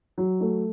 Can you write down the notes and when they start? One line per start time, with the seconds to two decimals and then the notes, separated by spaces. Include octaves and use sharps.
0.18 F#3
0.41 A3